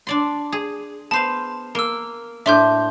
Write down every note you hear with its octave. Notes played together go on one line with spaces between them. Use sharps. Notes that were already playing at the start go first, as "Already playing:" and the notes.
D4 D5 C6
G#4
B3 C5 F5 A5
A#3 A#4 E6
A2 D4 E5 C6 G6